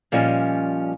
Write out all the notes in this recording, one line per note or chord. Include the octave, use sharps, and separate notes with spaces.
A#2 F3 G3 C#4 D#5 G#5